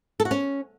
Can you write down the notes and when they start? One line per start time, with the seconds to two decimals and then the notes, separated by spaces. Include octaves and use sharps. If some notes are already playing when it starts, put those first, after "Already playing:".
0.20 A4
0.25 F#4
0.31 C#4